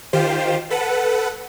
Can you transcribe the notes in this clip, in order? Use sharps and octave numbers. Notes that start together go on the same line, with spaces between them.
D#3 F4 G4 C5
A4 B4 F#5